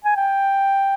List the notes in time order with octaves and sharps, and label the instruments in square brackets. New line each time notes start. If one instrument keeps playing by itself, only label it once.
[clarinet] G#5
G5